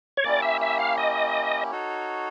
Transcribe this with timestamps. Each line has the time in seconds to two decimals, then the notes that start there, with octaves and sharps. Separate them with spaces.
0.17 C#5
0.24 A#3 C#4 E4 G4 D5
0.42 E5
0.61 E5
0.79 F5
0.98 D#5
1.71 D#4 F#4 A4 C#5